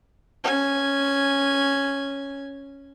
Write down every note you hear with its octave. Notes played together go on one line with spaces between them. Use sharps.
C#4 G#5